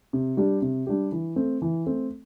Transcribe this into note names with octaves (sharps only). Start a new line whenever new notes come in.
C3
G3 D4 G4
C3
G3 D4 G4
E3
A3 C4
E3
A3 C4